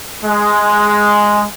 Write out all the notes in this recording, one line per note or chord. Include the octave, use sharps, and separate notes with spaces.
G#3